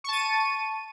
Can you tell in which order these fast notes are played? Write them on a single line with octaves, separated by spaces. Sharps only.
C#6 A5 D#7